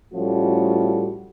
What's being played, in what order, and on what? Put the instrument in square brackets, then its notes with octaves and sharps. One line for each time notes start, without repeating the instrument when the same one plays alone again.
[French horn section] A2 F3 G3 A3 C#4 F#4